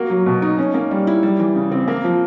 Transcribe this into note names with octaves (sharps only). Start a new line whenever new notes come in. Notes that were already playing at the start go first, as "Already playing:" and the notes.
Already playing: A#3 F#4
F#3
B2
D#4
C#4
A#3
G3
E4
G3
E3
C#3
C4
A#3
F3